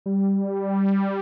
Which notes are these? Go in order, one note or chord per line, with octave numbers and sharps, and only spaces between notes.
G3